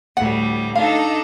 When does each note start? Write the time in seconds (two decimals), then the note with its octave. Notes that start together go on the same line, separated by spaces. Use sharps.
0.17 D2 A2 G3 F#5
0.75 D4 D#4 A4 F5